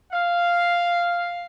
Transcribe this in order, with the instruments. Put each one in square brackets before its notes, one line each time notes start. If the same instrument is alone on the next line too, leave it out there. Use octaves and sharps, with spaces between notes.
[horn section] F5